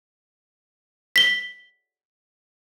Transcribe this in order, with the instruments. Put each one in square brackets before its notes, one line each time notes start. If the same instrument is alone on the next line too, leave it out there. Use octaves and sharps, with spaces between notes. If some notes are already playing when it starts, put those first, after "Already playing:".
[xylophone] B6 G7